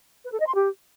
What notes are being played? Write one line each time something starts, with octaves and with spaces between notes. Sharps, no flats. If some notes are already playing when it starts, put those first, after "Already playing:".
B4
A4
D#5
C6
G4